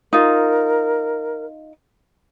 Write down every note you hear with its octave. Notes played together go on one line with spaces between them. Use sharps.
D#4 F4 A#4